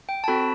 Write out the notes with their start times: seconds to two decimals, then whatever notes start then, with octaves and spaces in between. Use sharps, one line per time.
0.09 G5
0.24 A5
0.28 C4 F#4 A4 B5